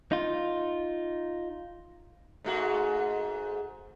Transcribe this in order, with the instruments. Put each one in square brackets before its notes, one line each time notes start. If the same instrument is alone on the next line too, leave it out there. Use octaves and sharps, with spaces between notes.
[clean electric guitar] D#4 F4
[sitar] G#2 A3 F#4